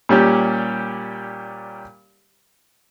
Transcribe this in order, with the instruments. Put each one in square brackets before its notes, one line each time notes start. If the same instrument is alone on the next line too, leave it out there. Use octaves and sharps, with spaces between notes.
[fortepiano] A#2 G3 C#4 G4